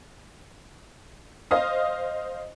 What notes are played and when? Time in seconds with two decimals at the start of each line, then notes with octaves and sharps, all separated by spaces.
1.51 C5 D#5 F5 D#6